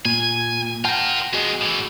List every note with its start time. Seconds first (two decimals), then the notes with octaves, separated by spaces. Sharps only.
0.05 A#2 G#5
0.85 F4 A#4 F#5 G5 A5
1.33 G#3 B3 F#4 G#4 D#5
1.61 A2 E3